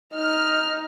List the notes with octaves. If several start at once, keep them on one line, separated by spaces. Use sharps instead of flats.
D#4 F6